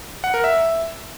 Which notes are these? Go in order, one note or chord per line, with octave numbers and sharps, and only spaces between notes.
F#5
A#4
E5